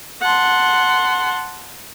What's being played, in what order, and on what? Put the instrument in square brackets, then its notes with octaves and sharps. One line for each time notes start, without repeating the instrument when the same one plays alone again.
[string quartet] F#5 A5 C6